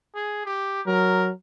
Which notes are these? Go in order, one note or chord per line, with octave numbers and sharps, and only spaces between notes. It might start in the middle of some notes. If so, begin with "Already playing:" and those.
G#4
G4
F#3 A#4